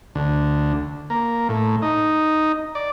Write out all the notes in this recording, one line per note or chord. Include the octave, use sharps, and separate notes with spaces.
D2
A#3
A2
D#4
D5